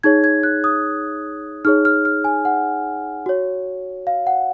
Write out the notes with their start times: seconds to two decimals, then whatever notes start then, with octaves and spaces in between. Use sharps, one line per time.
0.03 D#4 G#4 C#5 G#6
0.24 G#6
0.43 F#6
0.64 D#6
1.65 D#4 G#4 C#5 F6
1.85 F6
2.05 F6
2.24 G#5
2.45 F#5
3.26 F#4 C#5
4.07 F5
4.27 F#5